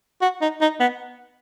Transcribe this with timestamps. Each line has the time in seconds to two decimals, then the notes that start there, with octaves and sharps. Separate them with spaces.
0.21 F#4
0.41 D#4
0.61 D#4
0.80 B3